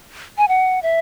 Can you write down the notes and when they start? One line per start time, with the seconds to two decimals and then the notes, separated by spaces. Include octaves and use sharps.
0.38 G#5
0.48 F#5
0.83 E5